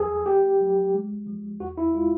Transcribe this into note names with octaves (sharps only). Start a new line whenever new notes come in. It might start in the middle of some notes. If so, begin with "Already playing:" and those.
Already playing: E2 F3 G#4 A4
A3 G4
F#3
G#3
F3
E2 F#4
E4
G#3 F4